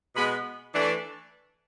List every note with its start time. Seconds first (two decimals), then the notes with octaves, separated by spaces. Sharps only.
0.16 B2 G#3 B3 B5
0.74 E3 A3 D4